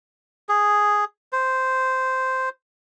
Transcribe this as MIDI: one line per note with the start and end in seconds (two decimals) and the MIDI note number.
0.49 1.04 68
1.33 2.49 72